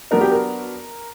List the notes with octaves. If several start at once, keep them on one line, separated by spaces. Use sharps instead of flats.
F#3 B3 D4 A#4
G4
A#4